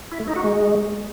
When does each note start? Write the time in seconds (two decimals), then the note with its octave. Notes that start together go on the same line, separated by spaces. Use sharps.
0.12 E4
0.20 A3
0.28 D#4
0.36 F#4
0.44 G#3